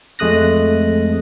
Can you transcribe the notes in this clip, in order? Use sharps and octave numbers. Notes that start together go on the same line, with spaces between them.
F2 G#3 A3 D#6 F#6 A#6